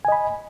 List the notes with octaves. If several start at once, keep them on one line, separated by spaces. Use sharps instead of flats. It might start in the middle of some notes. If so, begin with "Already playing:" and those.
D#5 G#5 B5